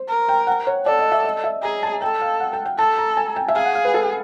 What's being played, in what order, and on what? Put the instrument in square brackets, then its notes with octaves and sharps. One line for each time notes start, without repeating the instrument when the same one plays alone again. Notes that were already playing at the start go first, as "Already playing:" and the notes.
Already playing: [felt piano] C5
[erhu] A#4
[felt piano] G5
F#5
C#5
[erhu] A4 [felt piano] D5
[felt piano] D#5
E5
D#5
E5
[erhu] G#4 [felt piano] A#5
[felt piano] A5
[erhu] A4 [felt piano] G5
[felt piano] F5
F#5
G5
G5
[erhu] A4 [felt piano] A5
[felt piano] A#5
G#5
G5
E5
[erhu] G#4 [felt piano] F5
[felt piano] F#5
F5
B4
A4